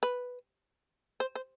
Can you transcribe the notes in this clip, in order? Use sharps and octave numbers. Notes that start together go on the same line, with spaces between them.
B4
C5
C5